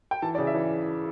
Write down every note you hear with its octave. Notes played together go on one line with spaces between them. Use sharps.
G5
E3 A5
D5
C#3
E5
E3